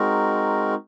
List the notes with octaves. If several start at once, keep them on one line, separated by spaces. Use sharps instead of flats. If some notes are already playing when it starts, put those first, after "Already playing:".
Already playing: G#3 C4 D#4 F#4 A#4